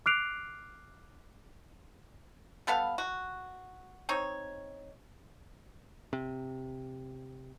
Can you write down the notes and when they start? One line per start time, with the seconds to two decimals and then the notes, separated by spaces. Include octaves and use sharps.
0.06 D6 F6 F#6 C7 D7 F7
2.67 G3 B3 A4 F5
2.98 F#4
4.09 C4 D#4 C#5
6.13 C3